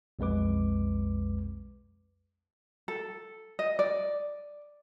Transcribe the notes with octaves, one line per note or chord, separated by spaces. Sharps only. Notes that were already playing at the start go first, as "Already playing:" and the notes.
B1 F2 G#3 B4 D6
A4
D#5
D5